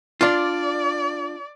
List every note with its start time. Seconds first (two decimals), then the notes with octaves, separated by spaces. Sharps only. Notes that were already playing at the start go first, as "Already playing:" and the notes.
0.21 D4 F4 D5